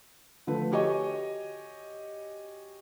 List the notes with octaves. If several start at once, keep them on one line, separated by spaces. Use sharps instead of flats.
D3 F3 A3 B4
F#4 G4 C#5 D#5 G#5 C#6